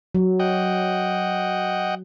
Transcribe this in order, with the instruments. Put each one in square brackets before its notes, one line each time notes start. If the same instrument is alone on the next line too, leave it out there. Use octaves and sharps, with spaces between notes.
[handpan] F#3
[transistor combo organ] D#5 F#5 G5